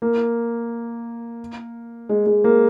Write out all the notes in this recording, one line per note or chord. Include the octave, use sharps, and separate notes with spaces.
A#3
G#3
G#3
A#3